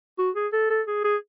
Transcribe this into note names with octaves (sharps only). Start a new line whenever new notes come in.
F#4
G#4
A4
A4
G#4
G#4